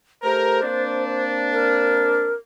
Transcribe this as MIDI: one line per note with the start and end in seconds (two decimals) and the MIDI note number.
0.23 0.58 57
0.23 0.58 67
0.23 0.58 70
0.23 1.26 72
0.62 2.32 58
0.62 2.32 60
0.62 2.32 62
1.52 2.33 70